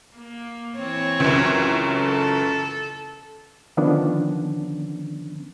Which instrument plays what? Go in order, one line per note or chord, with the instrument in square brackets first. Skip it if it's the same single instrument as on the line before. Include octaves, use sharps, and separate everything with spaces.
[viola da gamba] A#3
E3 C4 C#5
[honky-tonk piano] C#2 F#2
[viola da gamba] A4
[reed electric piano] D3 D#3 F3 B3 C#4 D4